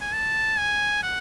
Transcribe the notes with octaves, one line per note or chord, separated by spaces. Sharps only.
G#5
A5
G#5
F#5